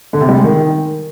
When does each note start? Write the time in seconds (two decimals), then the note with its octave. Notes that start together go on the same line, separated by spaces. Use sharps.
0.13 D3
0.21 C3
0.29 G3
0.36 G#3
0.44 D#3